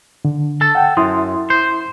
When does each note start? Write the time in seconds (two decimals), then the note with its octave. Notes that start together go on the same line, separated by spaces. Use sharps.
0.25 D3
0.61 A4 A5
0.75 F#5 G5
0.97 F#2 E4 C6 D#6
1.50 C5